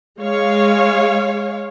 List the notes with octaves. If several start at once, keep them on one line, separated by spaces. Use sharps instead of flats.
G#3 C#5 F5